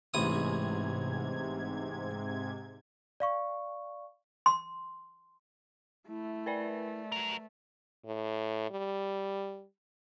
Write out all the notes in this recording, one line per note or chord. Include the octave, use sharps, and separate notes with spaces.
A1 G#2 C3 D#6 G#6
D5 F5 C#6
C6
A3 E4
A#4 B4 D5
F#3 A#4
A2
G3